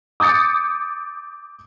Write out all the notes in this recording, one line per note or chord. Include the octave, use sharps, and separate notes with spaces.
D6 D#6 G6 A6 C#7